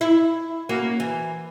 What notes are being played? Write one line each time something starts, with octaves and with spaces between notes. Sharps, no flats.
E4
A#3 C#4 F#4
E3